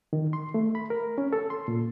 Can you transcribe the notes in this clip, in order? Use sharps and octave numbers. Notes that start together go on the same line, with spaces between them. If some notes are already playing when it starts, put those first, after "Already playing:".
D#3
C6
A3
B5
A#4
C#4
A4
C6
A#2